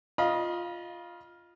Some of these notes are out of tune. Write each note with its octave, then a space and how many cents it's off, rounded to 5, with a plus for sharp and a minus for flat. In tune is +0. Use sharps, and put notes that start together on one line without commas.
F4 +0 D#5 +0 B5 -40